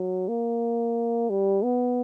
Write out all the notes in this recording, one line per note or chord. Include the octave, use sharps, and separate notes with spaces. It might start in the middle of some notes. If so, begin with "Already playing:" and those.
Already playing: F#3
A#3
G3
B3